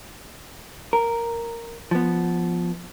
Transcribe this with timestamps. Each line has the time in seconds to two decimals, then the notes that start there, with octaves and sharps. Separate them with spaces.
0.93 A#4
1.91 F3 B3